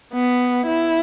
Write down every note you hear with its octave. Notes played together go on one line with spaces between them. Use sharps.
B3
E4